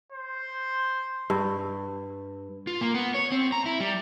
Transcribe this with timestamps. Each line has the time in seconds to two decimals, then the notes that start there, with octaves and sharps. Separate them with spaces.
0.12 C5
1.30 G2
2.67 F4
2.81 A#3
2.94 B3
3.14 C#5
3.32 C4
3.52 A#5
3.66 E4
3.80 G3